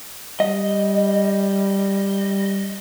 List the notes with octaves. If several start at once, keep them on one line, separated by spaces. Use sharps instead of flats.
G3 D#5